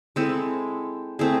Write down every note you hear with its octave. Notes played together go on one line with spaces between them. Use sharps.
G#3 C4 E4 A4
A3 C4 E4 G#4